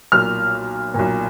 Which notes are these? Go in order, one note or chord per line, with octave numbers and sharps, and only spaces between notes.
B1 A#2 F6
B1 A#2